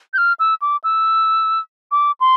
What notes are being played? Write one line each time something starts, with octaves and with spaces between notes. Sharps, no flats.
G6
F6
E6
D6
E6
D6
C6